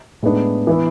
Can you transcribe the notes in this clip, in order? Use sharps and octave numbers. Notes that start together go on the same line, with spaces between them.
A2 G#3 B3 D4
E3 B3 E4